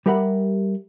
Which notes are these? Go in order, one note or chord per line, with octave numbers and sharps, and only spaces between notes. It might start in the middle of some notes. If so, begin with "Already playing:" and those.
G3 G4 A#4 E5 F#5 B5